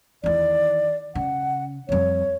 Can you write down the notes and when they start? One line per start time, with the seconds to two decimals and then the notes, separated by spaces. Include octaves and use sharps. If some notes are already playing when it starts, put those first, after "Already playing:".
0.24 E2 D#3 D5
1.15 C#3 F#5
1.89 F2 G3 C#5